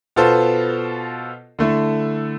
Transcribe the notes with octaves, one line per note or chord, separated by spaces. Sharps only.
B2 B3 F4 A4 C5
D3 A3 E4